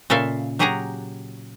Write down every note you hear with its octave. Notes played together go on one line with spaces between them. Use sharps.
A#2 C#3 A4 E5 F5
F#3 G4 G#4 F#5 G#5 A#5